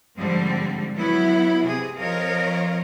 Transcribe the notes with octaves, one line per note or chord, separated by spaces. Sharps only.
G#2 D3 F3 G3 C4
F#3 B3 E4
C3 G#4
F3 C4 A#4 C#5 D#5 F5